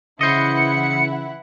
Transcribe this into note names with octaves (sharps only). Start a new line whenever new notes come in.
C#3 E3 E4 C5 D#5 F#5 C#7